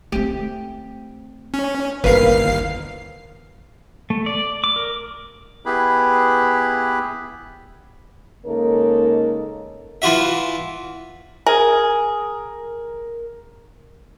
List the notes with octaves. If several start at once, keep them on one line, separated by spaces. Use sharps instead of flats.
A3 C4 G4
C#4
G1 D#2 E4 A#4 B4 F5 C7
A3
D5
D6
A#4
B3 E4 G4 G#4 B4 B5
C#3 G#3 A#3 D#4 A4 A#4
E3 F4 F#4 E5
G#4 A#4